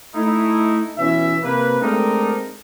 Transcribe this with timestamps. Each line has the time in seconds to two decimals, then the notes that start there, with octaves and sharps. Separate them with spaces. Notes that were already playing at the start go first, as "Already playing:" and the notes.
0.15 A3 D#4 E4
0.97 B2 E3 C#4 E5
1.43 C3 A#3 B4
1.81 G#3 A3 C4 D4 D#4 A#4